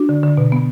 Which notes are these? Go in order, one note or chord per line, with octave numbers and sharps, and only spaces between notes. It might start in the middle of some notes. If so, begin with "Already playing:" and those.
Already playing: D4 F#4
D3
D3
B2
B3